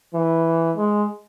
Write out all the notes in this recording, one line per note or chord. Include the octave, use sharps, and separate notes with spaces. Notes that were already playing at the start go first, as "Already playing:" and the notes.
E3
G#3